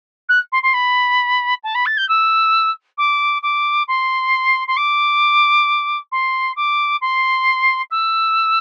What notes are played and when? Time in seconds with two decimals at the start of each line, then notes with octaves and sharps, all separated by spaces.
0.29 F#6
0.52 C6
0.62 C6
0.73 B5
1.63 A5
1.74 B5
1.86 A6
1.97 G6
2.08 E6
2.97 D6
3.42 D6
3.88 C6
4.67 C6
4.76 D6
6.11 C6
6.56 D6
7.01 C6
7.91 E6